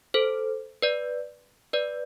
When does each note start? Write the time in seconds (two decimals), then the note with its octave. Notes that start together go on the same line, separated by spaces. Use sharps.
0.14 A4 C5
0.82 B4 D5
1.73 B4 D5